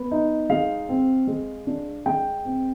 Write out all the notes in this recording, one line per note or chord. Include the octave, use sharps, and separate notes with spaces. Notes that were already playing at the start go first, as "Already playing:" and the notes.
Already playing: B3
D#4
G#3 F5
C4
G#3
D4
G#3 G5
C4